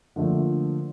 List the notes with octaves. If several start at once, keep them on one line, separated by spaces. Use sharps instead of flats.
D3 F3 A3 A#3